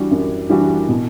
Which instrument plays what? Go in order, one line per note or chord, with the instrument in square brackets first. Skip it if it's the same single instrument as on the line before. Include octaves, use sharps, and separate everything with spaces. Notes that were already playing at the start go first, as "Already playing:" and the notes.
Already playing: [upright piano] E3 G3 D4 F#4
F#2
E3 G3 D4 F#4
B2